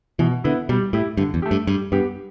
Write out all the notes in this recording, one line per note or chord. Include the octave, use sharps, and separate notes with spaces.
B2 E3
D3 B3 E4
B2 G3
A2 E4 G4
G2 D3
E2
A3 G4
G2
G2 G3
G2 B3 G4